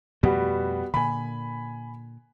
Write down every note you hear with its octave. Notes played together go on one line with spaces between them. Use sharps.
F2 B2 G3 A3 B3 F#4
A#2 D3 G#5 B5